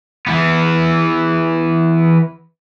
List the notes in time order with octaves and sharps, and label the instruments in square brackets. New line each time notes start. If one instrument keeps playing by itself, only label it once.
[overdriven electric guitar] E3 B3